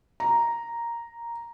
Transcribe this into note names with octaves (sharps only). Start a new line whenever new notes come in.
A#5